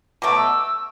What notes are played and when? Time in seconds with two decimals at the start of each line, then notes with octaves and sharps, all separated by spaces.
0.22 B2 F#3 A3 D6
0.37 E6